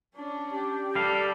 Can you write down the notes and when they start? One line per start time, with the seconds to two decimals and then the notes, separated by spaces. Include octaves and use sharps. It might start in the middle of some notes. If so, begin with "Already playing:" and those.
0.16 C#4 D4
0.51 G4
0.95 G3 A4 D5 F5